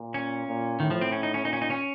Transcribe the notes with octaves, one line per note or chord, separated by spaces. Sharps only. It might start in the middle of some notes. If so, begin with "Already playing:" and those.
Already playing: A#2
C#4
A#2
A2 D#3
F3
C4
C#4
D#4
C#4
A#2 D#4
C#4
D#4
C#4